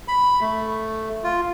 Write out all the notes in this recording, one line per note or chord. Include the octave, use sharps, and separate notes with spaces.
B5
A3
F4